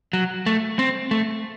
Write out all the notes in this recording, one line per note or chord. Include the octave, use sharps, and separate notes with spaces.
F#3
A3
C4
A3